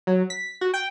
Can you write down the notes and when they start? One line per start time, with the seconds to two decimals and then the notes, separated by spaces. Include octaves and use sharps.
0.07 F#3
0.30 B6
0.61 F#4
0.74 G5